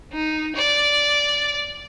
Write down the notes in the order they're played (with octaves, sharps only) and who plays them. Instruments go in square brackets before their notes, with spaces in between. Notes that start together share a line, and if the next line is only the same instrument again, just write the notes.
[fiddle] D#4
D5